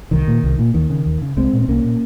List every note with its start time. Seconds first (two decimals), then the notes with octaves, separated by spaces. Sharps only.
0.11 C2 D#3
0.27 A#2
0.43 C2
0.59 A#2
0.74 D#2 D#3
0.90 C#3
1.06 D#2
1.22 C#3
1.37 C2 G#3 C4
1.53 A#2
1.61 C4
1.68 C2 A#3 C#4
1.84 A#2